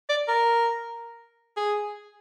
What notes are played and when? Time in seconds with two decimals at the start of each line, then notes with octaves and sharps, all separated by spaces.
0.09 D5
0.28 A#4
1.57 G#4